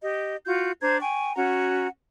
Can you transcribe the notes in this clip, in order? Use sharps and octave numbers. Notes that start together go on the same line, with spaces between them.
G4 D#5
F4 F#4 G6
D4 C5 A#5 G#6
G5 G#5 C#6
C#4 F#4 F#5 A#5